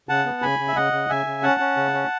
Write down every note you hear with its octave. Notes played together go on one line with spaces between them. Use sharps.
C#3 F#5 A5
B3
C#3 G#5 B5
C#3
E5
C#3 D#5 F#5
C#3
C#3 E5 G#5
C#3
C#4 F#5 A5
C#4
C#3
C#4